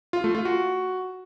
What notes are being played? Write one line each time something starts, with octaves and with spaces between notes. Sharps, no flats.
F4
A3
F4
F#4